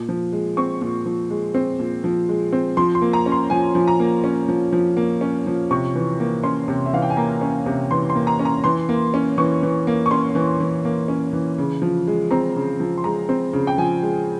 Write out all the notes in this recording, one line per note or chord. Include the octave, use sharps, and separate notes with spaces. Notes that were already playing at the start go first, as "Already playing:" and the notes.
Already playing: A#2
F3
G#3
C4 C#6
A#2
F3
G#3
C4
A#2
F3
G#3
C4
F3 C6
C6
A#3
A#5
C#4
C6
F3 G#5
F3
A#5
A#3
C#4
F3
F3
A#3
C#4
F3
C3 C#6
E3
A#3
C#4 C6
C3
E5
E3 F5
G5
G#5
A#3 A#5
C#4
C3
E3 C6
C6
A#3
A#5
C#4
A#5
E3 C6
A#3
C#4
E3 C#6
E3
A#3
C#6
C#4 C6
E3
E3
A#3
C#4
E3
C#3
F3
G#3
C4 A#5
C#3
F3
C6
G#3 A#5
C4
C#3
G5
F3 G#5
G#3